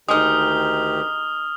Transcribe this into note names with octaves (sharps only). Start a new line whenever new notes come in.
D2 D#3 G#3 D#4 G4 D#6 F6